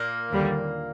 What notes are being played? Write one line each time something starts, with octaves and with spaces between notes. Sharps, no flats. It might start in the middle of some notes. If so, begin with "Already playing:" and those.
Already playing: A#2 A#3
D#2 D3 G3